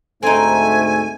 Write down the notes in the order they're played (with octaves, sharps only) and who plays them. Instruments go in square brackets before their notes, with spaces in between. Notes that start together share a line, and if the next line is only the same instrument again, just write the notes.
[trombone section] D2 G#2 A3 [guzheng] C4 D#4 [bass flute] A4 [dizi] G#5